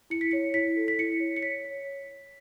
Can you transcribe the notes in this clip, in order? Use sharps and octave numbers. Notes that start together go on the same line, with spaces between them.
E4 C#7
B6
C#5 C#7
E4 B6
A4
B6
E4 C#7
C#5
C#7
C#5 B6
C#5